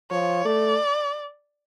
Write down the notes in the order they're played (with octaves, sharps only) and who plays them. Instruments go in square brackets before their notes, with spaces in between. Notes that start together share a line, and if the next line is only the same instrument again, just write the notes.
[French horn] F3 [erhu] C#5
[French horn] A3 [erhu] D5